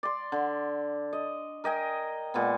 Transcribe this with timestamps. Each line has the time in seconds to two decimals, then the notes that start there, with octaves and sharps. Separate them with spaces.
0.03 D5 C6
0.32 D3
1.13 D#5
1.64 A#4 D#5 G5 G#5
2.34 A#2 G#3 B3